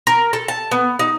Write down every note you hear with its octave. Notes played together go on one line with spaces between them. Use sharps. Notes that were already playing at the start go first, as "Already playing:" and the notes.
A#4
A4
A5
B3
D#4